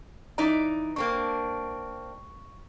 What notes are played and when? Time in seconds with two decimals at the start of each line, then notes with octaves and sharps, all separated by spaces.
0.38 E3 D#4 D5 A#5
0.96 A#3 C4 D4 C#6